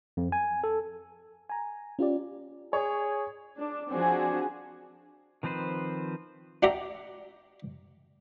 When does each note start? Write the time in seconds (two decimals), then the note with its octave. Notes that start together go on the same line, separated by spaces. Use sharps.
0.17 F2
0.32 G#5
0.64 A4
1.49 G#5 A#5
1.99 C#4 F4 G4 D5
2.73 G#4 C#5
3.57 D4
3.92 F3 C4 D4 F#4 G#4
5.43 D#3 F3 C4 B4 C5
6.63 D4 F#4 G4 D5 E5 A#5